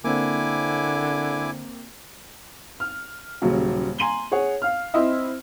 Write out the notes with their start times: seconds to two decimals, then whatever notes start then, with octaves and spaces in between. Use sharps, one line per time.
0.04 D3 A#3 C4 E4 G#5 D6
2.80 F6
3.42 D#1 D#2 C#3 F#3
3.99 G#5 A#5 C6 D#7 F#7 G7
4.32 G#4 C#5 F#5
4.62 F5 F6
4.94 C4 E4 C5 D#5 E5